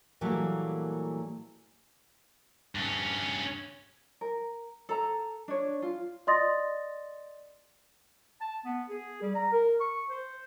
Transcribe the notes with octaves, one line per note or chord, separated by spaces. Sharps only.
A#2 E3 F#3 G3 A3 A#3
G2 C#4
A#4
A4 A#5
D4 C#5
F4
D5 D#5 C6 D#6 A6 A#6
A5
B3
G#4
G3
A#5
A#4
C#6
C5